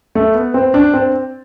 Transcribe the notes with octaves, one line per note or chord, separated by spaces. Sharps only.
A3
B3
C4
D4
C4